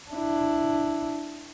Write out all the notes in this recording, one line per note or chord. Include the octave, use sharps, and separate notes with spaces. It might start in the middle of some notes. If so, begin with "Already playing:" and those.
D4 E4